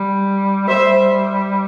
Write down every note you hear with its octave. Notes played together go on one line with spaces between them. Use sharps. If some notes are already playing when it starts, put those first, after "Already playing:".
Already playing: G3
G3 C5 E5